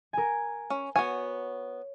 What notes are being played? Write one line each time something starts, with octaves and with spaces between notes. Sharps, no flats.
A#4 G#5
C#4
B3 F#4 C#5 G#5